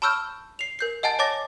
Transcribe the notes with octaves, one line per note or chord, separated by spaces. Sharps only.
A5 B5 C#6 E6 F6 G6
C7 F7
A#4 G6 C7
D#5 F#5 G#5 A5 A6
C#5 A5 D6 A6 A#6